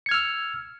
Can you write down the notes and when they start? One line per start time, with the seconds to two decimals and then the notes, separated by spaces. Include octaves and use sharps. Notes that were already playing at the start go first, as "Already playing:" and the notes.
0.06 C#7
0.09 G#6
0.11 F6
0.14 E6